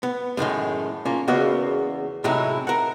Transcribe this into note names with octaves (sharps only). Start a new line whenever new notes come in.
B3
F#2 A2 D#3 G#3
A#3 C#4 F4
E2 C#3 A#3 B3 F#4 D#5
A2 C3 F#3 G#3 D#4 E4
A#4 F#5